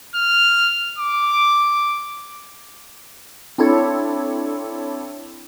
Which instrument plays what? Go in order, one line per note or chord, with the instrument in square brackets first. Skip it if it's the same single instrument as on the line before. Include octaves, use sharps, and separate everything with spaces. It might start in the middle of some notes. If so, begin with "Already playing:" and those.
[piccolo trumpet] F6
D6
[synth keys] C4 D4 E4 A4 C#5